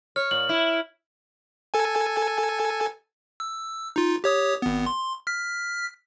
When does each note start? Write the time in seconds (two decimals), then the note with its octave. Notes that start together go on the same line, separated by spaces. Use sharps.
0.16 C#5 F6
0.31 A#2 F#7
0.49 E4
1.74 A4 G#5
3.40 E6
3.96 D#4 F4
4.24 G4 C#5 D#6
4.62 G#1 B3
4.86 C6
5.27 F6 B6